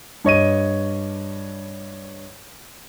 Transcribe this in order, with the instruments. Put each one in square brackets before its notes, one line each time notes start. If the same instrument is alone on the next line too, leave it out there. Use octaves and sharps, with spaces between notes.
[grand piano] G2 C#5 D#5 D#7